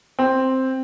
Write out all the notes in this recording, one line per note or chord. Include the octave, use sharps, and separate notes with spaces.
C4